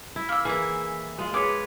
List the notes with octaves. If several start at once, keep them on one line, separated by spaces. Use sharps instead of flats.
E4
A#3 E6
E3 A#3 E4 G#4 E5
G#3 F4
G#4 B4 C#5 D6 D#6